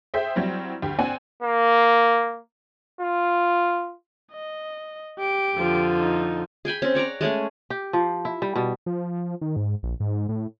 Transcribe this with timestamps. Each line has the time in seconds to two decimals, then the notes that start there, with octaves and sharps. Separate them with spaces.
0.14 G#4 C5 E5 G5
0.36 F#3 G3 C4 E4
0.82 D2 G4
0.99 C4 D5 F#5 G#5
1.43 A#3
3.01 F4
4.33 D#5
5.19 G4 D7
5.55 F2 D3 F3
6.00 D#4
6.65 G#4 G5 G#5 B5
6.82 C4 C#4
6.95 C#5 D5 F#5 A#5
7.21 G#3 A3 C#4 G#4
7.70 G4
7.93 F3
8.25 E4
8.42 G3
8.55 B2 G3
8.86 F3
9.41 D#3
9.56 G#2
9.83 A#1
10.00 G#2
10.29 A2